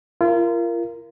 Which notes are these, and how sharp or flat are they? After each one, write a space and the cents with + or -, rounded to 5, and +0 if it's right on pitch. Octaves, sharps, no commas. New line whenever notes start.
F4 -35 A#4 +0